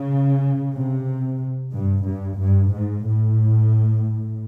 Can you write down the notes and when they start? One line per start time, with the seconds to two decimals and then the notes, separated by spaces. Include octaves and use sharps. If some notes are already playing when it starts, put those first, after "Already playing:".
Already playing: C#3
0.74 C3
1.73 G2
2.06 G2
2.39 G2
2.72 G#2
3.05 A2